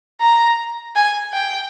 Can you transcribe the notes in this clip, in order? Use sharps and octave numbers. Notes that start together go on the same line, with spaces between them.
A#5
G#5
G5